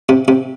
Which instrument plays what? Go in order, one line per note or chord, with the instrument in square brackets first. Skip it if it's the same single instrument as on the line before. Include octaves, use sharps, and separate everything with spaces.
[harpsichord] C3
C3